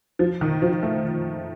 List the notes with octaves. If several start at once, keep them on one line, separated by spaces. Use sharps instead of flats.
F3
D#3
F3
A3